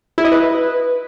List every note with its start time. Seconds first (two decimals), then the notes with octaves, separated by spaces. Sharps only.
0.18 E4
0.25 D#5
0.31 B4